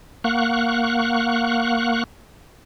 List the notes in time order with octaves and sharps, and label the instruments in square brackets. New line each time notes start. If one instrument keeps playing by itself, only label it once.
[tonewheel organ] A#3 F5 F#5 C#6 F#6